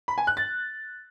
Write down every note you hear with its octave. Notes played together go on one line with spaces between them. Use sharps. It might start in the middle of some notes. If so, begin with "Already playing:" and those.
B5
G#5
F#6
A6